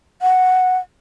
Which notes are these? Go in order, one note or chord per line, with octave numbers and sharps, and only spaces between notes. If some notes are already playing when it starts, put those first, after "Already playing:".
F#5